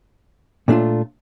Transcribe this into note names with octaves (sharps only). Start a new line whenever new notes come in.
A#2 A3 D4 F4